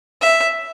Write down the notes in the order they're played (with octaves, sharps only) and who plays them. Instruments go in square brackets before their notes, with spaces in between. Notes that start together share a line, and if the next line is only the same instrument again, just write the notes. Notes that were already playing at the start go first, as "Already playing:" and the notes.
[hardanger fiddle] E5